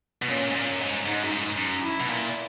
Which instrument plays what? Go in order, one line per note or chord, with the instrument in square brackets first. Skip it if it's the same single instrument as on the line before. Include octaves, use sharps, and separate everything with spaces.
[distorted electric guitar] B2
[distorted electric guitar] A#2 [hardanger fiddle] C#4
[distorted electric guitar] G#2
A#2
F#2
G#2
[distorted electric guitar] G#2 [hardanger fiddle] D#4
[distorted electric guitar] F#2
G#2
F#2
[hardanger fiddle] E4
[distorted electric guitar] B2
A#2